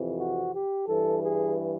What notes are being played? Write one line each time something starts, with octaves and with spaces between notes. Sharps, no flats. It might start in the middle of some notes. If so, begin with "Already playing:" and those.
Already playing: F2 C3 E3
F#4
G4
G2 E3 A4
G#4